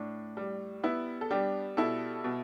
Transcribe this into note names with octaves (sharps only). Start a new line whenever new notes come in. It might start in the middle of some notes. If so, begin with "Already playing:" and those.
Already playing: A2 D4
G3
B3 E4
A4
G3 D4 G4
B2 E4 A4
B2